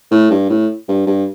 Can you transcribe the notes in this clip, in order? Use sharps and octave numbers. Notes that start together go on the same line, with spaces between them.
A2
G2
A2
G2
G2